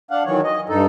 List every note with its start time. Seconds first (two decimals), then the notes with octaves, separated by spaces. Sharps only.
0.11 D4 F5 F#5
0.26 D#3 E3 F#3 C#5
0.44 D#5
0.69 G2 D#4 A4